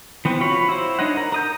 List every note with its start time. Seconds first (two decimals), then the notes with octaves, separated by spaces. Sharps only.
0.25 E3 B3 C4
0.40 F4 F#4 C#5 B5 C#6
0.69 E4 C5
0.99 D4 D#4 C#5 D#5 F#5
1.17 A#4
1.32 A#4 D#6 G6